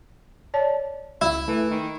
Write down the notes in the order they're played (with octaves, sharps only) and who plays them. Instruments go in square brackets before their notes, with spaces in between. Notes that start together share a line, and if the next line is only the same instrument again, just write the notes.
[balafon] C#5 D5 A5
[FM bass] C#2 [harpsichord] E4
[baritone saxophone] E3 [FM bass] A3
[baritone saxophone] D#3